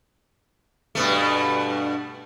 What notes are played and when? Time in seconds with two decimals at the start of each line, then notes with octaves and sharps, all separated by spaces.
0.95 G2 B2 A3